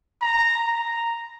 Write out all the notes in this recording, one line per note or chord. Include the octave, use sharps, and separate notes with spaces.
A#5
A#5